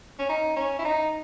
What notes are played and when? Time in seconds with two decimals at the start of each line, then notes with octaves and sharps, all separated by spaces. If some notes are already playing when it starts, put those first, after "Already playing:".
0.19 C#4
0.30 D#4
0.57 C#4
0.79 E4
0.85 D#4